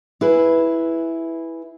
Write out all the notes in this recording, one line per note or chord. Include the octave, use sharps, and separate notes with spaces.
E4 G#4 B4